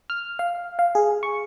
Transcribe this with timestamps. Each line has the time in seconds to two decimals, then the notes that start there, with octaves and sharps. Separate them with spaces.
0.10 F6
0.39 F5
0.79 F5
0.95 G#4
1.23 C#6